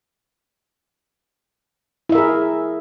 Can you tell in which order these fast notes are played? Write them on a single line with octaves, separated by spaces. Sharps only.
E4 E5 A#4 G#4